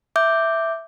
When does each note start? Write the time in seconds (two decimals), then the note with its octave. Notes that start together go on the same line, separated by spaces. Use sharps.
0.16 E5 D6 G6